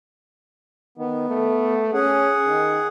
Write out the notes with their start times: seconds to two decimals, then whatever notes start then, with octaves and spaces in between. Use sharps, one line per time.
0.98 D#3 B3
1.29 A3
1.93 C#4 G#4 F#5
2.48 D#3